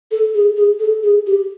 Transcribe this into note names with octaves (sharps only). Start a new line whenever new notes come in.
A4
G#4
G#4
A4
G#4
G4